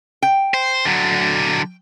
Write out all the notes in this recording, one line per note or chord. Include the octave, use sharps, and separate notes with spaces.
G5
C5
D3 F#3